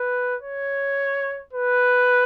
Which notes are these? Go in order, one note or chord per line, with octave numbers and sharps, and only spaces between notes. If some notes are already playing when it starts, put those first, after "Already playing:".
Already playing: B4
C#5
B4